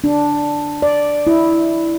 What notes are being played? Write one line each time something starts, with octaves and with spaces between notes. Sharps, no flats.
D4
D5
E4